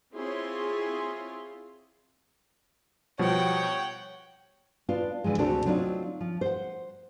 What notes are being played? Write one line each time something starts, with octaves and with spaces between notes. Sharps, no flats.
C4 E4 F4 G#4 C#5 C6
B2 F3 G3 C#5 F#5 G5
B3 D4 F4
D3 E3 F3 G#3
D2 C3 D4 F#4 A4
F#3 C4 D4 D#4 F4
F3
C5 F#5